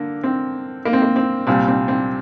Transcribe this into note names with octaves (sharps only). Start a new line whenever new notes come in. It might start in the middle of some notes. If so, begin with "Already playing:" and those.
Already playing: D3 A#3
C4
A#3
C4
A#3
C4
C2 A#2 G3 C4
C4
C4